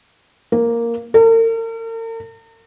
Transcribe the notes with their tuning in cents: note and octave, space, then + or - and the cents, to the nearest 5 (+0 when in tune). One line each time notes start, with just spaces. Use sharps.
A#3 +0
A#4 -45